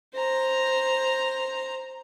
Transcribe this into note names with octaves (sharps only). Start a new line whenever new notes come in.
C5 A#5